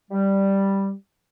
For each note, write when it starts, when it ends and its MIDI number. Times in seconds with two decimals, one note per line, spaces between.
0.11 0.92 55